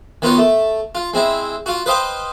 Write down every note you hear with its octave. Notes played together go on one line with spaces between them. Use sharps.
D#3 B3 F4 F#4 C#5
A3
F4
G#3 C4 E4
F4 F#4
B4 C5 D#5 F5 G5